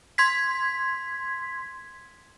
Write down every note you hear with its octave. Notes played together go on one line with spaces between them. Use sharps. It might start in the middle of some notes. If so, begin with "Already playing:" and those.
C6 G#6 B6